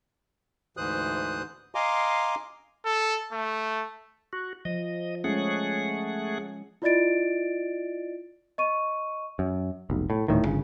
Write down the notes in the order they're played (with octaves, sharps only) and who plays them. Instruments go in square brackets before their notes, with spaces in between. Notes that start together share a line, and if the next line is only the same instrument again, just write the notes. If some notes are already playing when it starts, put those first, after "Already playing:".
[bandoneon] D2 G#2 E3 C5 D#6 F#6
D#5 F5 G#5 A#5 C6 D6
[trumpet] A4
A3
[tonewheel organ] F#4
[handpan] F3 [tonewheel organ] D#5
[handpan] G#3 C#4 [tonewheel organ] A3 G#4 F#5
[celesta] E4 F4 D5 D#5 A6 D7
D#5 C#6 D#7
[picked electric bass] F#2
F1 B1
A2
D#1 D2 A2 D#3
G1 C#3